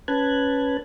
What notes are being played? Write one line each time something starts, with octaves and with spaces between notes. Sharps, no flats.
C#4 B4 A5 F#6 G#6